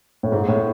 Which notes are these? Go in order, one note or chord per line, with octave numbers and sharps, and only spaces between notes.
A2
G#2
A2